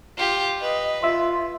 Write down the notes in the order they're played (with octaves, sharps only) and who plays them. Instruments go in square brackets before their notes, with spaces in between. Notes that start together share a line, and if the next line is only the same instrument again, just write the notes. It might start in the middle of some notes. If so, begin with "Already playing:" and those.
[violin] F4 G4
[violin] B4 [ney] D#5
[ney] F4 [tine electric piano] E5 C6